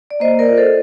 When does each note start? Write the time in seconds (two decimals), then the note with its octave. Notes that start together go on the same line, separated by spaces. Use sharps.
0.11 D5
0.20 A#3 C5 D#5
0.39 A#4 D5
0.49 F4
0.57 A4 C5